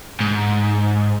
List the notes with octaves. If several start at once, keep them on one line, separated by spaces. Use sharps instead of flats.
G#2